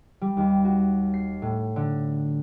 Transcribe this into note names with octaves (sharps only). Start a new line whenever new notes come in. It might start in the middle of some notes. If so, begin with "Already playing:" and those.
G3
D#2
F#4
C7
A2
D3